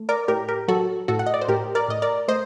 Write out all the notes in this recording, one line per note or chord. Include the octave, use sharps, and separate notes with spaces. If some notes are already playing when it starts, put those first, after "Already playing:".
Already playing: A3
A#4 D5
A2 G4 A#4
G4 A#4
F#3 F#4 A4
A2 F#4 A4
F#5
D#5
D5
C5
A2 G4 A#4
A#4 D5
A2 D#5
A#4 D5
A3 C5 D#5